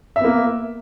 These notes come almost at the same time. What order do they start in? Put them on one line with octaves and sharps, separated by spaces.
E5 B3 A#3